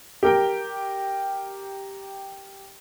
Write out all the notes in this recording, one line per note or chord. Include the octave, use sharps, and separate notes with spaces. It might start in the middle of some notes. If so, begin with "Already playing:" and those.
G4 A#4 G5